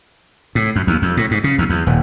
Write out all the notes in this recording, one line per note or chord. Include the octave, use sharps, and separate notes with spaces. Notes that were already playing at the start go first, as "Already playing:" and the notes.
A2
F#2
D#2
F2
A2
G#2
C#3
D#2
E2
D#1